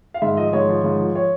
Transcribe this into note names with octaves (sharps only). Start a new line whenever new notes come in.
F5
G#2 E5
F3 D#5
G#2 C#5
F3
G#2
F3
C#5